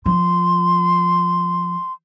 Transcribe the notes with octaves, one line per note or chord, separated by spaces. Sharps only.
F3 C6